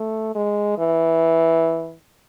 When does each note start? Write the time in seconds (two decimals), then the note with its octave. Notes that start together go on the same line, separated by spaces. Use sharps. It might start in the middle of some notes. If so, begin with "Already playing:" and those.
Already playing: A3
0.35 G#3
0.78 E3